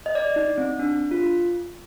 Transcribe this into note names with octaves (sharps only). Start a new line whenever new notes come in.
D#5
D5
D#4
C4
D4
F4